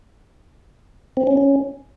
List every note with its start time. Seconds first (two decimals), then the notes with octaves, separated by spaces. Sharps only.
1.17 C4
1.27 C#4
1.37 C#4